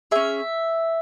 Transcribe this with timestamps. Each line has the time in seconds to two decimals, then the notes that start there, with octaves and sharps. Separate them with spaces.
0.11 C#4 G#4 E5